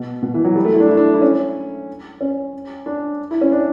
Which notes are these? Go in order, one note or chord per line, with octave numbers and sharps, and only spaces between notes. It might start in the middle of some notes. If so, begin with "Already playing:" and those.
Already playing: B2
B2
E3
F#3
G3
A3
E4
D4
E4
D4
E4
C#4
C#4
D4
E4
C#4
D4